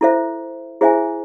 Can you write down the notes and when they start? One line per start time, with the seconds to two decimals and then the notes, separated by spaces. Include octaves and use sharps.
0.01 E4 A4 C5 E5
0.81 E4 G#4 C5 E5 G#5